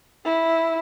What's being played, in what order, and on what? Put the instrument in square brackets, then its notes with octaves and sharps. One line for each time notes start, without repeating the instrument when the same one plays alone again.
[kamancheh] E4